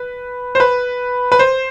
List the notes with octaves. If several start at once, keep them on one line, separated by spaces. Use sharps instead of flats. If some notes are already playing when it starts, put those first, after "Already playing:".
Already playing: B4
C5
B4
B4
C5